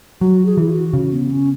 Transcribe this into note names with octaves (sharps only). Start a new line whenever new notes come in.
F#3 F#4
G#4
E3 E4
F#4
C#3
B3
C#4